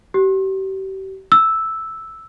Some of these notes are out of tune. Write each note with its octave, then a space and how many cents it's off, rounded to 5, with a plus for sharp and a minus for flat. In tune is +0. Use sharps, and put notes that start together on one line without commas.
G4 -35
E6 -5